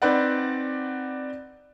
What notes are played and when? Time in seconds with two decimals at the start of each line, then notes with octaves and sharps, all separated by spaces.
0.02 C4 D#4 B4 D5 F#5